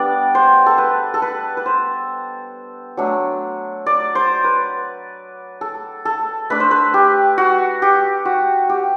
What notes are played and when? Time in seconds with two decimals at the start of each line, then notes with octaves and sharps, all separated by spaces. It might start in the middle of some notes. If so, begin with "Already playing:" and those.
Already playing: G3 B3 D4 D5
0.35 C5
0.66 A4
0.78 B4
1.14 A4
1.22 B4
1.57 B4
1.66 C5
2.97 F#3 A3 D4
3.86 D5
4.15 C5
4.44 B4
5.61 A4
6.05 A4
6.50 A3 D4 B4
6.60 C5
6.71 B4
6.94 G4
7.38 F#4
7.82 G4
8.25 F#4
8.69 G4